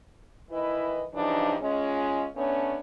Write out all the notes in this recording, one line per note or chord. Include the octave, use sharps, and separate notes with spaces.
D#3 E3 E4 B4 D#5
G2 C#3 E3 F3 D4 D#4
G#3 C#4 F4
A3 B3 C#4 D4 C#5